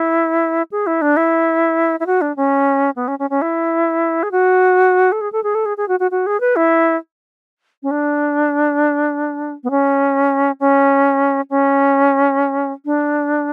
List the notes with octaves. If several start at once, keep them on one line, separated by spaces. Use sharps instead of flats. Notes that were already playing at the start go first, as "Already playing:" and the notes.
Already playing: E4
G#4
E4
D4
E4
E4
F#4
D4
C#4
B3
C#4
C#4
C#4
E4
G#4
F#4
A4
G#4
A4
G#4
A4
G#4
G#4
F#4
F#4
F#4
G#4
B4
E4
C#4
D4
B3
C#4
C#4
C#4
D4